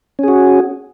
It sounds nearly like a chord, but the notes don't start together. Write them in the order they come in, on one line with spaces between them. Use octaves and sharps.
C#4 G#4 F#4